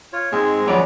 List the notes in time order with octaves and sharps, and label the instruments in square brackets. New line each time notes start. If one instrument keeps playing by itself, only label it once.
[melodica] F4 C#5
[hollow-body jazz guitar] G#2 [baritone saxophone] G#3 [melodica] C4 G#4
[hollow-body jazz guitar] F#2 C#5 D5 [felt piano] F3 D6 [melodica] B3 A#5